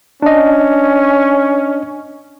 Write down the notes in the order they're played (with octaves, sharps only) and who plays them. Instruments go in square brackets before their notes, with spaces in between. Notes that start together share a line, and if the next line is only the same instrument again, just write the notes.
[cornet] C#4 [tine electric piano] D4 D#5